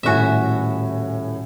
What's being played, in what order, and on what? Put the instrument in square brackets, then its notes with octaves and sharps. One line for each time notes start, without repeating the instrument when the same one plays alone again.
[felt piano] D#1 A2 G#5 [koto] F#4 E5